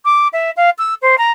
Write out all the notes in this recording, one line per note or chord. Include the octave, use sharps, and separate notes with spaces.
D6
E5
F5
E6
C5
A#5